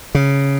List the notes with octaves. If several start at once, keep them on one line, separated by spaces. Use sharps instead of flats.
C#3